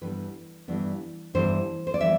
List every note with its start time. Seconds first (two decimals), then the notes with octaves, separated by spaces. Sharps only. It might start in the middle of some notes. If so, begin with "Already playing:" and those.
0.01 G2 E3 G3 B3 D4 B4
0.68 G2 E3 G3 B3 D4
1.34 G2 E3 G3 B3 D4 C5
1.87 C5
1.94 D5
2.01 E3 G3 B3 E5